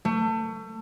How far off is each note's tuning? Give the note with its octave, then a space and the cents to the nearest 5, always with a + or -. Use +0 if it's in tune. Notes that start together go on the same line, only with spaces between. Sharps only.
A3 +25